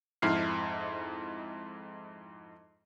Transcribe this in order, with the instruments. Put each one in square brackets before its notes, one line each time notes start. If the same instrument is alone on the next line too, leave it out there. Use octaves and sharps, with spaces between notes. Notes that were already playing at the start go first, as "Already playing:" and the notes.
[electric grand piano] F2 G#2 E4 F6 C7